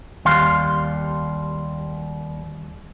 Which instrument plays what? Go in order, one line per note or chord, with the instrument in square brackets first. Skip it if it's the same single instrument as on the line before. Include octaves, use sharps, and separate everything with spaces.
[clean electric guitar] D#2 G3 F5 C6